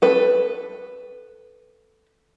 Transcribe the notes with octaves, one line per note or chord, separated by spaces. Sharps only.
A4 B4